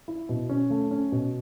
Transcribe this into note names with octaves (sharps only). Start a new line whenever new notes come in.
E4
B2
C#4
A3
C#4
B2